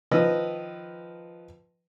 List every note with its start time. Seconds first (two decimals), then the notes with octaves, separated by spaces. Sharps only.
0.11 D#3 F3 B4 D#5 E6